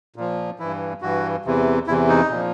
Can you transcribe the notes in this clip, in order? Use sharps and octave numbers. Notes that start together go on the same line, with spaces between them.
A#2 F3
G2 E3 E4
G2 E3 F#4
E2 C3 E3
E2 C3 E3 E4
D#4
A#2 F3